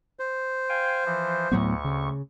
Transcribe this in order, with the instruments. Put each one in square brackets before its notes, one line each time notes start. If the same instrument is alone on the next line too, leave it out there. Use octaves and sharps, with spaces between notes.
[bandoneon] C5
[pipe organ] F5 G5 G#5
E3 F3
[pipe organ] D2 C#6 [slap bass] A2 F#3 B3
[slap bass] C#3